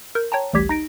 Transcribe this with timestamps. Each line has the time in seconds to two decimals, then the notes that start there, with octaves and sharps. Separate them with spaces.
0.15 A#4 G6
0.32 C#5 G5 A5 A#5
0.53 A1 D2 G3 G4 G#6 B6
0.69 D#4 A#6 D7